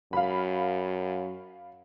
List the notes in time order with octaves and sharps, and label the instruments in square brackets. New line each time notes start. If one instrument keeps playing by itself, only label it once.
[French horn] F#2 [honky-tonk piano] F5 B5